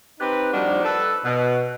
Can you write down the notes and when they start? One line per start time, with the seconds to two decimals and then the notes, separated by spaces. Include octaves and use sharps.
0.20 C4 D#4 G4 B4
0.52 F3 G3 A#3 D4 D#4 F#4
0.84 A4 B4
1.24 B2